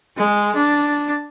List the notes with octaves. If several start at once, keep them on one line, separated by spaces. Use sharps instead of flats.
G#3
D4